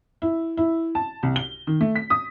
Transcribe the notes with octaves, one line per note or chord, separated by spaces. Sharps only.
E4
E4
A5
C2
G7
D#3
A3
B6
D#6